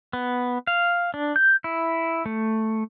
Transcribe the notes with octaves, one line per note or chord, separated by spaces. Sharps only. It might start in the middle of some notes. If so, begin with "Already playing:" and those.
B3
F5
D4
G6
E4
A3